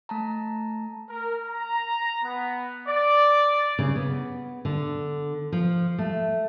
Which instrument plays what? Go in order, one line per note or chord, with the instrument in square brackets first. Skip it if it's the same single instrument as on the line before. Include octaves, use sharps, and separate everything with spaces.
[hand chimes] A3 A5 A#5
[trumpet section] A#4
A#5
B3
D5
[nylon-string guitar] C#3
B3
D3
F3
A3